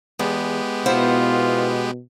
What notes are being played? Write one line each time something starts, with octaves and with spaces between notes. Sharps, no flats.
E2 G#3 B3 G4
B2 E4 F4 C5 F#5